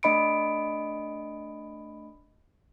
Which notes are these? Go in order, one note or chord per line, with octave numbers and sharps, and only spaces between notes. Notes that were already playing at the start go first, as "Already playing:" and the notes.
A3 D4 D#5 B5 C#7 D7